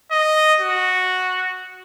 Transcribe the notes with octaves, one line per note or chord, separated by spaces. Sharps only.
D#5
F#4